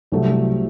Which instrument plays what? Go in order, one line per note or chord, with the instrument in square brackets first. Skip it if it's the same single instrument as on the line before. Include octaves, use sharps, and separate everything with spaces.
[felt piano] C2 C3 F#3 A3